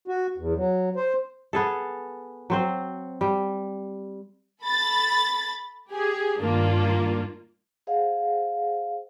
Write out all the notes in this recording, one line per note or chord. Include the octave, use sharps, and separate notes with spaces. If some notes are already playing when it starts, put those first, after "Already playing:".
F#4
E2
F#3
C5
B3 G#4 A4
F#3 C4 C5
G3
A4 B5 A6
G4 G#4
G2 D#3 A#3 D4 F4
G#4 C5 D#5 F5 F#5